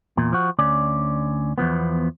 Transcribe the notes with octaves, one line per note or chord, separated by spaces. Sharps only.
E2 A#2
F3 F#4
D2 C#4 D5
E2 G2 F3 B3